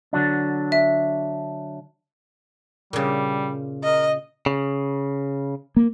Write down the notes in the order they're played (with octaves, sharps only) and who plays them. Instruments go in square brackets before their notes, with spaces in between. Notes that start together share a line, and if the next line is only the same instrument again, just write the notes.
[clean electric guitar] D3 F#3 D4
[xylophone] E5
[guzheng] A#2 C#3 [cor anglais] G3
[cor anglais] A#4 [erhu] D#5
[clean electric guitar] C#3
[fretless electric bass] A#3